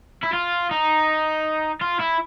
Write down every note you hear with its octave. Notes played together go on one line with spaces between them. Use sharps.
E4
F4
D#4
F4
E4